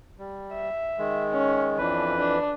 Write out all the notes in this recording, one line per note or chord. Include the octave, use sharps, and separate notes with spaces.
G3
E5
D#3 G#3
C#4
F2 E3 D4 B4
D4